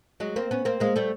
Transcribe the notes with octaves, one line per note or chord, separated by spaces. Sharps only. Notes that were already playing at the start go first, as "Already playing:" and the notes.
F#3 G#3
A#3 C4
B3 C#4
A#3 C4
G#3 A#3
G3 A3